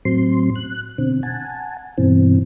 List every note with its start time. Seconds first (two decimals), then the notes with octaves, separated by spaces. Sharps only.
0.05 A2 F#3 C4 C6
0.55 F#6
0.98 B2 D3 C4
1.23 F#5 G#5 A5
1.98 G2 B2 E3 C4